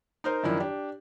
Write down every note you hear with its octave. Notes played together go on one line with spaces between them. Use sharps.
D#4 A#4 C5
F#2 D#3 F3 D4 E4
D4 G4